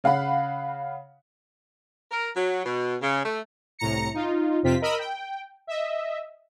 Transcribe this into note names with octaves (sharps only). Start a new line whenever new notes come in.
C#3 F5 F#5 B5
A#4
F#3
B2
C#3
A3
C2 A2 A#5 A#6 C#7
D#4 F4
F2 C3 C4 F4 B6
A#4 D#5 B5 E6
G5
D#5 E5